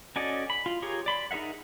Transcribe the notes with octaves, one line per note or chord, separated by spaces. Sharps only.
C#4 F#4 A4 D5 D#5
B5
F4
F4 G4 G#4 A#4 C#5
D5 B5 C6
D#4 G#4 A#4 E5 F#5